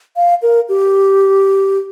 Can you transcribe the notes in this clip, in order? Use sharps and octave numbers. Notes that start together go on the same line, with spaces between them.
F5
A#4
G4